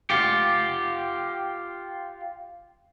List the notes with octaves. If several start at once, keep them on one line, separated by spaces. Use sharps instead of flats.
F4 G4